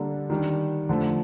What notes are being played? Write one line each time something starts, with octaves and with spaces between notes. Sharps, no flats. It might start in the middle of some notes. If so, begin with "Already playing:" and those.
Already playing: D3 G3 A#3 D4 A4
D#3 G3 D4
D3 F3 A3